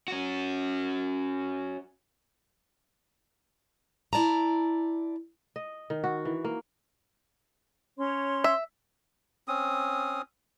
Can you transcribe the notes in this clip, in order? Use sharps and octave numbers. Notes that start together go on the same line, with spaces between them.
C#4 F#4
E4 D5 A5 A#5
D#5
D#3
F#4
E3
A#3
C#4 C#5 C6
E5
C4 C#4 D#6